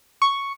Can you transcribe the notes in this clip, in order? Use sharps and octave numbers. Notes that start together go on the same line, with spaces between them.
C#6